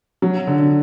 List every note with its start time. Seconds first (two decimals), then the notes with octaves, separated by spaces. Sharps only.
0.22 F#3
0.47 D3